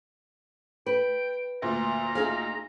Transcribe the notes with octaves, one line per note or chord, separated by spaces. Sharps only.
B4 G5
D2 A#2 A#5
D#4 G#4 F5